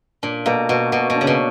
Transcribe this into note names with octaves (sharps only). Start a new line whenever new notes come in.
A#2 D4
B2 A#3
B2 F#4
B2 F#4
B2
D4
C#3
B2